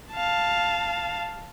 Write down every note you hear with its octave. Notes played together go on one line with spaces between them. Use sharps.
F5 A5